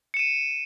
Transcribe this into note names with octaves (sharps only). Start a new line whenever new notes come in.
C#7 D#7 E7